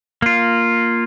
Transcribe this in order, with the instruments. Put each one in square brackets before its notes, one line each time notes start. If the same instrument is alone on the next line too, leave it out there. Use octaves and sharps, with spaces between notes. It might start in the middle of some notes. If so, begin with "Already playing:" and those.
[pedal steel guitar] A#3 F4